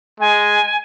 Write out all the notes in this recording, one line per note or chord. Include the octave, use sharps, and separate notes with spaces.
G#3 G#5